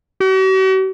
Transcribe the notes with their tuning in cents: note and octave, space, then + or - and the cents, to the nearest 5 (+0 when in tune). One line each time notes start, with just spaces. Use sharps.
F#4 +45